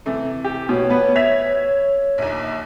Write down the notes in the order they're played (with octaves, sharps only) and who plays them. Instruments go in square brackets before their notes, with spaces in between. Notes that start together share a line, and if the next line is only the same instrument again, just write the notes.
[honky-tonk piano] C3 E3 A3
[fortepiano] G4
[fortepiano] B2 [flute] C#5
[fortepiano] B3 [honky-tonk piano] B4
[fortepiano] E5 [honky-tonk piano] G#6 B6 F7
[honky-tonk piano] A#1 D#2